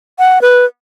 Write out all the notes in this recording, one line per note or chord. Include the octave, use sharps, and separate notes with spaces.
F#5
B4